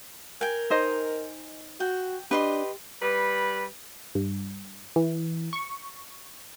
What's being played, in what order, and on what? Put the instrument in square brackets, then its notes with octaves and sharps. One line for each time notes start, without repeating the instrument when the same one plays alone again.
[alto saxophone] A#4 [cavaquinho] G5 G#5
[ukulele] D#4 C5 D#5
[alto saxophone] F#4 [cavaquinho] G5
[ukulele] D4 [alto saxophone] G4 [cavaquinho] B4 D#5 C6
[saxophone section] G3 B4
[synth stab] G2
E3
C#6